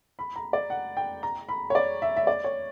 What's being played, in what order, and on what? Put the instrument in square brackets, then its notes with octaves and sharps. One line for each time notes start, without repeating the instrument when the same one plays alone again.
[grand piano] B5
A#5
D5
F#5
G5
A#5
B5
C#5
D5
E5
E5
D5
C#5